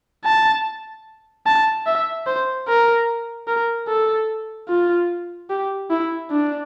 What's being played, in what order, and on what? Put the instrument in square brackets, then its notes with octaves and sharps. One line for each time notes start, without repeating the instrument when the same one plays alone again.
[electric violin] A5
A5
E5
C5
A#4
A#4
A4
F4
G4
E4
D4